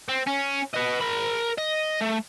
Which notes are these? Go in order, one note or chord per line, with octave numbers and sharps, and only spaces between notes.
C4
C#4
B4 D#5
A#4 B5
D#5
A3